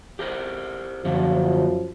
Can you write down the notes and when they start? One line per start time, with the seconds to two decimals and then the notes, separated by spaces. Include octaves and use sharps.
0.19 G4 A#4 C5
1.05 F#2 D3 F3 A#3 C#4